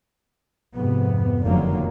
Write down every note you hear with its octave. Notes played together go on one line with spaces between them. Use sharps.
F2 G#2 C3 B3
F1 F#2 D3 D#3 F#3 A#3